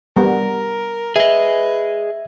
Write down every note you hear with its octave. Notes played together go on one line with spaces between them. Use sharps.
G3 B3 A#4
G#4 B4 D#5 E5